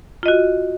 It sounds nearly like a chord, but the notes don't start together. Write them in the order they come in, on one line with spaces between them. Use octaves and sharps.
F4 D#5 F#4